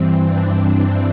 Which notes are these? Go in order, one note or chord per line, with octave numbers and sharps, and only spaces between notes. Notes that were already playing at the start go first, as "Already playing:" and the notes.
Already playing: G2 E3 C4
D4